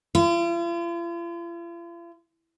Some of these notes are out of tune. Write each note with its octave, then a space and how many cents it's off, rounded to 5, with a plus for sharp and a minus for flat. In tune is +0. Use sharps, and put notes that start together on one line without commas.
F4 -45